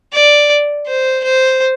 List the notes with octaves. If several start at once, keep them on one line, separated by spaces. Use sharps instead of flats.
D5
C5
C5